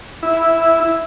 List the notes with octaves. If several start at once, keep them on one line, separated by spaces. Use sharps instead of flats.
E4